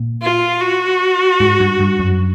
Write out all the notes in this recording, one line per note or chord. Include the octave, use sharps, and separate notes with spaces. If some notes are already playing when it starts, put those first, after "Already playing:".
Already playing: A#2
F4
F#4
G#2
G2
G2
F#2